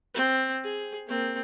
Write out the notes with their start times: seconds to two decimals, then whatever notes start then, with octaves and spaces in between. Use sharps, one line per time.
0.14 C4
0.64 G#4
1.07 A#3 C4